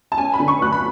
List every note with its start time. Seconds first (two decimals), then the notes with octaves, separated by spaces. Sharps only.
0.12 A5
0.18 C#4 G#5
0.34 B5
0.40 D3
0.48 C#6
0.62 D2 F#6
0.73 B5